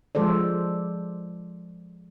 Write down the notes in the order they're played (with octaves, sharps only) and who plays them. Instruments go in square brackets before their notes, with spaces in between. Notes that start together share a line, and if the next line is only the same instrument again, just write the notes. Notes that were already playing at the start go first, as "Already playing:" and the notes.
[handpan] F3 G#3 A4 C5 D5